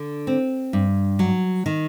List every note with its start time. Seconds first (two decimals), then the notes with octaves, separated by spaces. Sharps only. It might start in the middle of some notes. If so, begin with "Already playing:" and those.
Already playing: D3
0.27 C4
0.73 G2
1.19 F#3
1.66 D#3